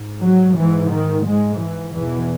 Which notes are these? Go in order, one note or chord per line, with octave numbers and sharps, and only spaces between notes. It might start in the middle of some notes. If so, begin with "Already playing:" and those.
Already playing: G#2
F#3
G#2 E3
D#3
G#2 G#3
E3
E2 B2 E3